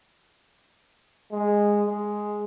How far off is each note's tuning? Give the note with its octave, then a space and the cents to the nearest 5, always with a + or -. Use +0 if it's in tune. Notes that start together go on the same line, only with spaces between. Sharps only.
G#3 -10
G#3 +0